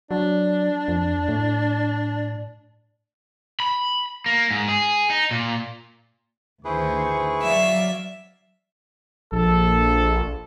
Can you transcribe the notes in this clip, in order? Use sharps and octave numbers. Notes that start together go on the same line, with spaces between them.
F#3 D4
F2
A2
B5
A#3
G#2
G#4
D#4
A#2
D2 D#3 E4 G#4 B4 C5 C#6
F#3 D5 E5 F5
A#1 A4